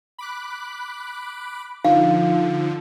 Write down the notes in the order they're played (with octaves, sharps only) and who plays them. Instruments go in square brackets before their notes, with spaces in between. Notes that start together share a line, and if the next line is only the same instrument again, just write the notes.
[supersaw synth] B5 D6 F#6
[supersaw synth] D3 F3 [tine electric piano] D#4 F4 [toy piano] F5